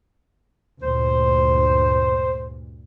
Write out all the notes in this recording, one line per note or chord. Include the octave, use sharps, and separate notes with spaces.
D2 G2 A#2 C5